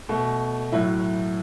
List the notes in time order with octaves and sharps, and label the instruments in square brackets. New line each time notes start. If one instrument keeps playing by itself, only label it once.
[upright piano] B2 A3
A2 F#3 E4